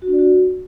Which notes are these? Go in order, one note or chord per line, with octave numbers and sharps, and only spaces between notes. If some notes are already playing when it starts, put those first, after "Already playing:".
F#4
D4
D5
F#4